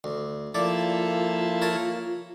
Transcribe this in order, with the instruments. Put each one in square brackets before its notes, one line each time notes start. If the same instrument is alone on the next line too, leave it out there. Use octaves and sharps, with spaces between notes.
[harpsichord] D2
[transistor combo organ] F3 E4 A4 [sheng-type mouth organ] A#3 [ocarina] F4 [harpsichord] D5
[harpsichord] A#4 C#5 A5